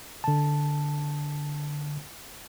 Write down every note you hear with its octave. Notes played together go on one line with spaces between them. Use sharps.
D3 A5